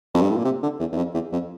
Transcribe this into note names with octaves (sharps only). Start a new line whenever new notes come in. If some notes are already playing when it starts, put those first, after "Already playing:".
F2
G2
A2
A#2
C3
D3
E2
E2
F2
E2
F2